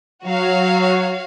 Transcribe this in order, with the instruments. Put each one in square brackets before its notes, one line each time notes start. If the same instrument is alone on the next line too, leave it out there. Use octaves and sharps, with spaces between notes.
[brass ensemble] F#3 [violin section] F#4 C#5 F5